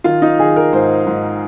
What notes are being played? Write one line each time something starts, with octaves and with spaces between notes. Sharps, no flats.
D#3 F4
D#4
D#3 G#4
A#4
G#2 C5
G#2